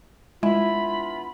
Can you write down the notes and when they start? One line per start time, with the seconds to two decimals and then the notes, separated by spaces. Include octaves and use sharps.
0.43 G#3 B3 D4 E4 F4 B5